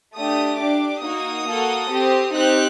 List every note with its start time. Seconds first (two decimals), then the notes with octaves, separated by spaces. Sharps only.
0.15 A3 D4 G4 D#6
0.59 D4 G4 D6
1.03 A#3 D#4 F#4 D#6
1.47 A#3 F#4 A4
1.91 C4 G4
2.35 C4 D#4 G4 F#6